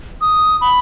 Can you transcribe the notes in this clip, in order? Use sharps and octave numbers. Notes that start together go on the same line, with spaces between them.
D#6
B5